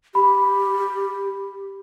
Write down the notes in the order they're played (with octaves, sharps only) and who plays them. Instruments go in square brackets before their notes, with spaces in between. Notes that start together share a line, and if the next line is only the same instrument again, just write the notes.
[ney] G4 [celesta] B5